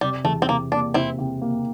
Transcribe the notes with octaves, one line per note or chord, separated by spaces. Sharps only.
C3 G3
E2 A3
C4
C3 A#3
A#3 D4
C3 C4 E4
C3
A#3